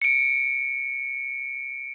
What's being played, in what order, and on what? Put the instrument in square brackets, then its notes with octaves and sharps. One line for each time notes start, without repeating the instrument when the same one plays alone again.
[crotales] C#7 D7